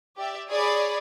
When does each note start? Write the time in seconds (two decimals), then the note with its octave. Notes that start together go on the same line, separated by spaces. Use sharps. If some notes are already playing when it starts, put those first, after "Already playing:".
0.17 G4 D5 E5
0.48 G#4 C#5 D5 B5